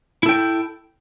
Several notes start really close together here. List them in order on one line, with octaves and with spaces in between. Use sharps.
E4 A4 G5